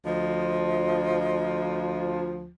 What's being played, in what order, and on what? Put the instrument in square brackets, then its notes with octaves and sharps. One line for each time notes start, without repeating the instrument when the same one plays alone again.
[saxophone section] D2 F3 [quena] D#5